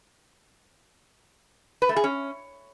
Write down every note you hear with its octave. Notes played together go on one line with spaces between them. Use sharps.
B4
A3
G#4
C#4